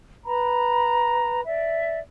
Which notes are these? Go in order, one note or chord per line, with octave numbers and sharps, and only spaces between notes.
B4 A#5 B5
D5 E5